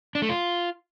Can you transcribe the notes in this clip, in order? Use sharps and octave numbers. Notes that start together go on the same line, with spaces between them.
D4
A3
F4